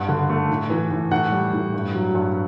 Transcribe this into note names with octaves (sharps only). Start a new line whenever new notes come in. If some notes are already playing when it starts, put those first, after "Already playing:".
Already playing: G2 F#5
D3
A3
A2
E3
A2
A2 F#5
G3
A2
G2
F#3
G2